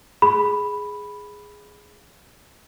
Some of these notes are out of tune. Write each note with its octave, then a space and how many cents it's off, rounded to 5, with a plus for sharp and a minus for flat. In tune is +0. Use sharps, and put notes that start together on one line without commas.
G#4 +0 B5 +0